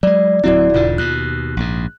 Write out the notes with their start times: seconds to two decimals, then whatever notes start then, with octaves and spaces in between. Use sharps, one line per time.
0.03 F#3 G#3 D5
0.44 D1 F#3 C4 E4 F#4 D5
0.74 E1 G#2 D3 F4
0.98 D#2 B2 F#6
1.57 A#1 G#2